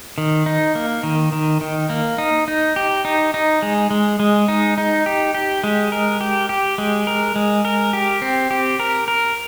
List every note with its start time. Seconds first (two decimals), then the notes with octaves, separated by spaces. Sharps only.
0.18 D#3
0.46 D#4
0.75 A#3
1.03 D#3
1.32 D#3
1.61 D#3
1.90 A#3
2.18 D#4
2.48 D#4
2.76 G4
3.05 D#4
3.34 D#4
3.62 G#3
3.91 G#3
4.20 G#3
4.48 D#4
4.78 D#4
5.06 G4
5.35 G4
5.64 G#3
5.92 A#4
6.21 G4
6.49 G4
6.78 G#3
7.07 A#4
7.36 G#3
7.65 A#4
7.93 G4
8.22 C4
8.51 G4
8.80 A#4
9.08 A#4